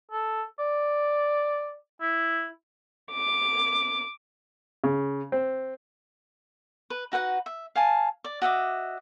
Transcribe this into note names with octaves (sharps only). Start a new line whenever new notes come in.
A4
D5
E4
D6
C#3
C4
B4
D#4 F#4 B4 F#5
E5
F5 G#5 A5
D5
F#4 D#5 E5 D6